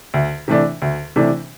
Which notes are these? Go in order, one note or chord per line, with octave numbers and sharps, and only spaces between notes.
D2
C3 E3 A3 D4
D2
C3 E3 A3 D4